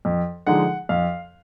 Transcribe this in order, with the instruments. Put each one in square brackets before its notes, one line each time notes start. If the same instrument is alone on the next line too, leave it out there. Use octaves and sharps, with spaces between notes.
[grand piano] F2
D3 F3 G#3 D#4 F#5
F2 F5